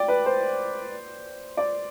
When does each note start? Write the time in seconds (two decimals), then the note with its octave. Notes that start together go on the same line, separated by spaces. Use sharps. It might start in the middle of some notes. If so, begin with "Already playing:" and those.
Already playing: D5 G5
0.08 B4
0.26 C5
1.57 D5